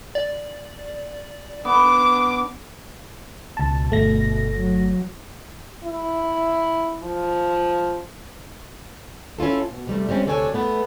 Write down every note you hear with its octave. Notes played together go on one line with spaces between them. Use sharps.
D5
B3 D4 D6
C#2 B2 A5
G1 A3 A#6
F#3
E4
F3
C#4 E4 F4 A4
B2
C3 G3 A3
G3 G#3 C4 C#4
D2 C3 D4 A4 C#5 G#5
A3 B3 B4